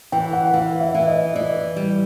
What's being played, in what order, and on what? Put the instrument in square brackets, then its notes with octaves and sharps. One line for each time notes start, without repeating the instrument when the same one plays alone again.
[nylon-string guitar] E3 [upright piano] G5
[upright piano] F#5
[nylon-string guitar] E3 [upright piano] F5
[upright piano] E5
[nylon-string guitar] E3
[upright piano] D#5
[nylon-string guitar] E3 [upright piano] D5
[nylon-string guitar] G3